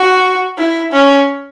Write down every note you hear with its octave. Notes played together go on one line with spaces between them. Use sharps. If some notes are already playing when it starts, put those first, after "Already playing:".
Already playing: F#4
E4
C#4